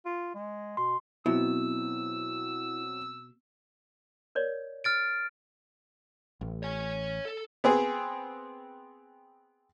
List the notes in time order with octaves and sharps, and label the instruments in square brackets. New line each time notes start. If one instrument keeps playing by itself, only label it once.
[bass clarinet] F4
G#3
[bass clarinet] B2 [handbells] C6
[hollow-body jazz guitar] B2 [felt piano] F#3 C4 [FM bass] E4 [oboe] E6
[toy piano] A#4 C#5 D5
[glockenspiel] F6 A6 D7
[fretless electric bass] A1
[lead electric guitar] C#5 G#5
A4
[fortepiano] B3 C4 G#4